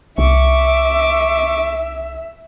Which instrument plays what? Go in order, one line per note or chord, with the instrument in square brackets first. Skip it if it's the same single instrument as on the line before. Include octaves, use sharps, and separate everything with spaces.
[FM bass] C2 [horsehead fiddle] E5 [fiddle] C#6 D6